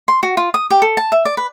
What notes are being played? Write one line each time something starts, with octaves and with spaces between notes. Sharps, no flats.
C6
F#4
F4
D#6
G4
A4
A5
E5
D5
B4